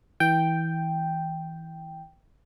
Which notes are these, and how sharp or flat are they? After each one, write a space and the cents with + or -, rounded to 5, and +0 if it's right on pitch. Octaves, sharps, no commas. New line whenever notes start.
E3 -20 G5 +0